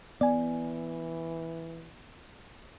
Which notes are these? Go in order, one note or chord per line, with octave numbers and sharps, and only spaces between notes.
E3 B3 D5 G#5